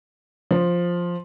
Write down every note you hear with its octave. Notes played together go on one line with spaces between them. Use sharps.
F3